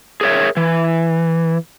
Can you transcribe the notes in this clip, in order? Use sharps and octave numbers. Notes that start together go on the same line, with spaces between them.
G#4 A#4 C#5 E5
E3